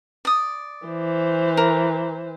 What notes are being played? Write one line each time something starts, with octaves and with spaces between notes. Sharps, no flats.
D5 D#6
E3 C5
A#4